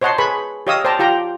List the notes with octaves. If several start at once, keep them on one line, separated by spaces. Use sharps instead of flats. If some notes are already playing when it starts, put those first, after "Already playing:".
C5 C#5 D#5 F#5 A5 C6
G#4 B4 B5 C#6
G4 C#5 D#5 F5 D#6 E6
C5 D5 G5 A5 A#5
F4 G4 G5 A#5